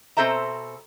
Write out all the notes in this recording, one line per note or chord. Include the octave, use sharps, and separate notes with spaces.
B2 C4 A4 C5 E5 A#5